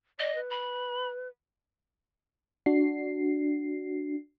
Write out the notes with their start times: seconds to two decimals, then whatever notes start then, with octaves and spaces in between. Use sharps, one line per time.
0.19 D5 D#5
0.35 B4
0.50 B5
2.66 D4 F#4 C7